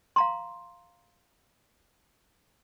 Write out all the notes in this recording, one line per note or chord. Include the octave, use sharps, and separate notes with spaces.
F5 A#5 C6